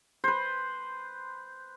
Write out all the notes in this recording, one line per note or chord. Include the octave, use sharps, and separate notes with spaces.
B4 C5